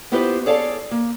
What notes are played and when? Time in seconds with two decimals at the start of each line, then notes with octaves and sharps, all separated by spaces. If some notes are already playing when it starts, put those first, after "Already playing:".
0.12 B3 E4 F4 G4 B4 C5
0.46 G#4 A4 C#5 D5 F5 A5
0.91 A#3